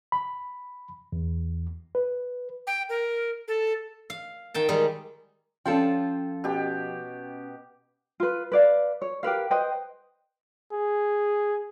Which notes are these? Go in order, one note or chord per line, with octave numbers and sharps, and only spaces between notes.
B5
E2
B4
G5
A#4
A4
F5
D#3 G5 A5
D#3 G3 G#3 D#4
F3 C#4 F4 A4 G5
B2 G4
F4 B4
B4 D5 F5
C#5
G4 A#4 B4 F5
B4 C5 D#5 G5
G#4